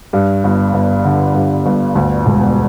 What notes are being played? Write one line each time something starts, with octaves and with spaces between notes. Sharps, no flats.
G2
G1
G1
D3
G2
G1
D2
E1